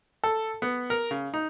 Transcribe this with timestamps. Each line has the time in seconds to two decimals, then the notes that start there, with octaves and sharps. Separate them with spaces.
0.24 A4
0.62 B3
0.90 A#4
1.11 C#3
1.34 D#4